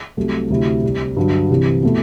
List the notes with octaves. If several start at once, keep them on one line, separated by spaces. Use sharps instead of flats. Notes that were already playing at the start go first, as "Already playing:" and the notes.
C2 C3 F#3 A3
D2 C3 F#3 A3 E4
C2 C3 G3
G2 D3 F#3
C2 C3 E3
B2 A3 E4